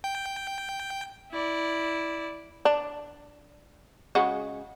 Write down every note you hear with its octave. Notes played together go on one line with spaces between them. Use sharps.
G5
E4 D5
D4
C#3 G#3 F#4